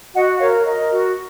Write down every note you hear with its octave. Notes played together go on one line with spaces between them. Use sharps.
F#4 D#5 F#5
A#4 C#5 F5
A#4 D#5
F#4